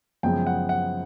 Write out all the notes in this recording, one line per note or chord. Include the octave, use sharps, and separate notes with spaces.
F#2 C#3 F3 G#3 B3 G5
F#5
F#5